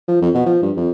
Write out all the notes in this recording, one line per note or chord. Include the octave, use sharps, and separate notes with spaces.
F3
F2
B2
F3
G2
F2